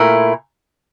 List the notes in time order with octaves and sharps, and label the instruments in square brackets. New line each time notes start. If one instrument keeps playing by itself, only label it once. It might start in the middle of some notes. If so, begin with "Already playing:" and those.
Already playing: [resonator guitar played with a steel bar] A#2 A3 E4 A#4